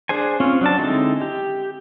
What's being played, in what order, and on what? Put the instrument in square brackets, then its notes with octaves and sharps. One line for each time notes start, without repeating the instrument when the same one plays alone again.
[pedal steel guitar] D4 G#4 C5 G#5
C4 C#4 F4
F#3 D4 A5
D3 G#3 C4 D#4 E4
G4